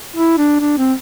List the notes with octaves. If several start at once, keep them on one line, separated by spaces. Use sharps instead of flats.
E4
D4
D4
C4